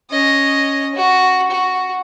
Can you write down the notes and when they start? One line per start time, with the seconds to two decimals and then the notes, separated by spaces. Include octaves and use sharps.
0.11 C#4 D#5
0.95 F#4
1.51 F#4